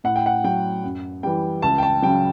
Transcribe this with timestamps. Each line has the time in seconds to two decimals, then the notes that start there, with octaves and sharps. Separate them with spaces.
0.04 A2 F#5
0.16 G5
0.26 F#5
0.44 F#3 G5
0.84 F#2
1.23 E3 G3 G5
1.62 C#2 A5
1.78 G5
1.82 A5
2.02 C#3 F#3 G5